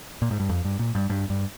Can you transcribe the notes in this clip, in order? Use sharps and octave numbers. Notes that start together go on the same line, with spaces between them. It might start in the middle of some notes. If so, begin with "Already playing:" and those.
A#2
G#2
G2
F2
G2
A#2
G2
G2
G2